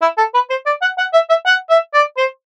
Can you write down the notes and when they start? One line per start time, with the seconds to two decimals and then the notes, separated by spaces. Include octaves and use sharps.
0.02 E4
0.18 A4
0.34 B4
0.50 C5
0.66 D5
0.82 F#5
0.98 F#5
1.13 E5
1.29 E5
1.46 F#5
1.70 E5
1.94 D5
2.17 C5